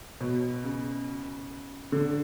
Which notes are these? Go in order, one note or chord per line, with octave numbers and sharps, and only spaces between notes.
B2
C#3
D3